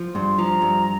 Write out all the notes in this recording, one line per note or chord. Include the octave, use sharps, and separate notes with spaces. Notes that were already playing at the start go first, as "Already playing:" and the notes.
Already playing: F3
G2 C6
F3 A#5
G2